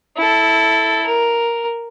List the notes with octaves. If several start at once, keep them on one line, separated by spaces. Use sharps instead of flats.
E4 A4
A#4